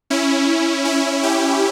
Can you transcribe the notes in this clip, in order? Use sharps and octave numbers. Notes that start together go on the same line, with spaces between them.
C#4 E4
C#4 E4
E4 G4